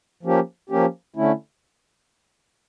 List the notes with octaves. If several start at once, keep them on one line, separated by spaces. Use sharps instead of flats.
F3 A#3 C#4 G4
F3 A#3 C#4 G4
D3 A3 C#4 E4